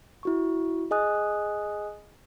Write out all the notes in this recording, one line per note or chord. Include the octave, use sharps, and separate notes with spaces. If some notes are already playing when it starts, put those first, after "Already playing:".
E4 F#4 C#6
G#4 D#5 G#5 D#6 F#6